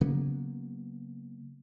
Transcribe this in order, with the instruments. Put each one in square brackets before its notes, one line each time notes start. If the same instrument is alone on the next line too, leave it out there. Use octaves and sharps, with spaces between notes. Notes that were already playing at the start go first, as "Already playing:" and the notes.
[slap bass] C#3 F#3 A#3 B3